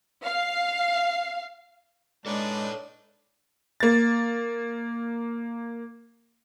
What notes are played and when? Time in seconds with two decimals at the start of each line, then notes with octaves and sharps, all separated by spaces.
0.25 F5
2.26 G#3 D4 D#4 A4 B4 C#5 D5
3.80 A#3 A6